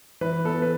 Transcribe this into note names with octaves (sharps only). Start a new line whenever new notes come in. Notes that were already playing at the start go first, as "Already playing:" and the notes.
E3 B4
B3 A4
B4